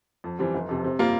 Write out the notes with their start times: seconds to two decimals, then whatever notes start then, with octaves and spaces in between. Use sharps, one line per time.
0.24 F2
0.39 E3 G3 C4
0.54 F1
0.69 F2 C3
0.84 C3
0.99 G3 A#3 F4